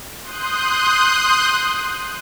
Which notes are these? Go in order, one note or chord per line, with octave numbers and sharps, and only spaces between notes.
C6 D#6 F#6 G6